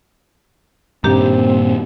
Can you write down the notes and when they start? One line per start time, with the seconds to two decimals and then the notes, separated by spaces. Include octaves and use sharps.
1.04 G2 A#2 D#3 A#3 C4 D4 G4